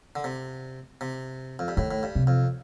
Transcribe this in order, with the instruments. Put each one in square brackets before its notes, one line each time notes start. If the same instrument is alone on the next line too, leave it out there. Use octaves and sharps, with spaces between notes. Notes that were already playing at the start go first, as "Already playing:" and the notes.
[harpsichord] D3
C3
C3
F2
G2
[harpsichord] A2 [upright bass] D#3
[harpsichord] A2
G2
[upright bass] C3
[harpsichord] F2